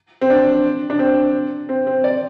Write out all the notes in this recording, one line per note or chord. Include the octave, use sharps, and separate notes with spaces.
C4
D4
D4
C4
C4
C4
D5